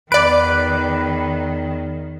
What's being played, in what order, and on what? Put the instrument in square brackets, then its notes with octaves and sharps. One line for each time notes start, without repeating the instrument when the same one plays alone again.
[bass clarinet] E2 [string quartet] D#3 [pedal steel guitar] B4 [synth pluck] D5 D7